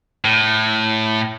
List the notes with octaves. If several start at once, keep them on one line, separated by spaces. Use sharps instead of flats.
A2